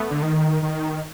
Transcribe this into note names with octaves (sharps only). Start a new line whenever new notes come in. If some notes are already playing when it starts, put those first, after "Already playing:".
Already playing: A3 B3
D3
D#3
D#3